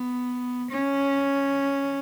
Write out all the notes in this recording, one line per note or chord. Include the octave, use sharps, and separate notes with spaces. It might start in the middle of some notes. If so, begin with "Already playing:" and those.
Already playing: B3
C#4